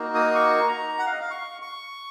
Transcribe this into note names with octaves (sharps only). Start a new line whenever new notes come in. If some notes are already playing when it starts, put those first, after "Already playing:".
Already playing: A#3 D#4 F#4
D#6
C#6
A#5
F#5
F5
D#5
F5
C#6
C#6